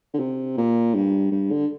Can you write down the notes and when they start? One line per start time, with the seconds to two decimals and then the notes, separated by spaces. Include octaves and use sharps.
0.14 D3
0.19 C3
0.58 A#2
0.95 G2
1.32 G2
1.51 D3